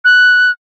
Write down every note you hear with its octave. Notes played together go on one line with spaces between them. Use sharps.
F#6